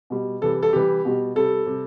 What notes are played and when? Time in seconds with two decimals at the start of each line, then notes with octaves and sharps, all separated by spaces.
0.10 B2 G3
0.41 C3 E3 G3 A4
0.63 A4
0.73 C3 E3 G3 G4
1.05 B2 G3
1.35 C3 G3 A4
1.66 C3 G3